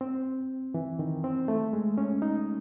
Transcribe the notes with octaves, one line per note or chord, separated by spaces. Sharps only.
C4
E3
D#3
C4
A3
G#3
C#4
D#4